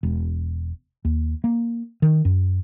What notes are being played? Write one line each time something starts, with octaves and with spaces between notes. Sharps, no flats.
E1
D#2
A#3
D#3
F#2